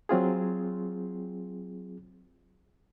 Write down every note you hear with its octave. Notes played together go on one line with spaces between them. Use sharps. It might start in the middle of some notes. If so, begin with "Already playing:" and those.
F#3 C4 F4 G#4